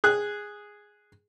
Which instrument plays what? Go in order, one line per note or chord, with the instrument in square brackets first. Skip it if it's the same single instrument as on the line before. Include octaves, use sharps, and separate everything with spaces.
[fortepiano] G#4 F#6